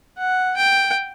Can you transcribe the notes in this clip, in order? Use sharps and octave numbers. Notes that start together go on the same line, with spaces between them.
F#5
G5